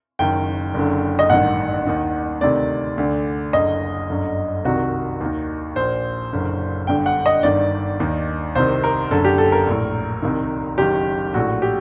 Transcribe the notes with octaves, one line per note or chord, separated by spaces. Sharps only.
F#1 F#2 D#3 G5
F#1 F#2 D3
D#5
A1 G2 D#3 F#5
D#2 D#3
D2 C3 D#3 D5
D2 D3
F#1 F#2 D3 D#5
G1 F#2 D3
C2 C3 D#3 F#4
D#2
D#3
A#1 A#2 C5
F#1 F#2 D3
G1 G2 D3 G5
F#5
D#5
G1 G2 D#3 D5
D#2 D#3
C2 C3 D#3 C5
A#4
F#1 F#2 D3 A4
G4
A4
A#4
A#1 A2
C2 C3 D#3
F#1 F#2 D#3 G4
A#1 A2 F#4
G4